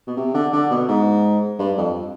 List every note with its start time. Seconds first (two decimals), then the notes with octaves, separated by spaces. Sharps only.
0.07 B2
0.17 C3
0.34 D3
0.53 D3
0.71 B2
0.88 G#2
1.59 G2
1.77 F2